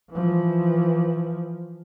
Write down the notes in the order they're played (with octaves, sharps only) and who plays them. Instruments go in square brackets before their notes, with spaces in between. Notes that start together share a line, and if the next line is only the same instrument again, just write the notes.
[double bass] E3 F3